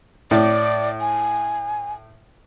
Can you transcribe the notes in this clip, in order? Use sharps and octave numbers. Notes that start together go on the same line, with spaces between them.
A2 D5
G#5